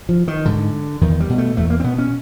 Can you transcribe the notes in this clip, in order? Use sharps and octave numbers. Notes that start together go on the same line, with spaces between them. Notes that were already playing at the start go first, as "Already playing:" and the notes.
F3
D#3
G#2 D3
E2 D#3
G3
B2
A3
E2 A3
A#3
C4
B2 B3
C#4